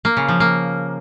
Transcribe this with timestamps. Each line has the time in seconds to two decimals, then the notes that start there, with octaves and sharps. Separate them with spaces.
0.05 A#3
0.17 C#3
0.29 F3
0.40 A#3